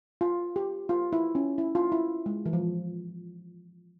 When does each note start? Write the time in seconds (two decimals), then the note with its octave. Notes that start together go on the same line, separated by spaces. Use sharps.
0.21 F4
0.56 G4
0.89 F4
1.13 E4
1.35 C#4
1.58 E4
1.75 F4
1.92 E4
2.26 G#3
2.46 E3
2.53 F3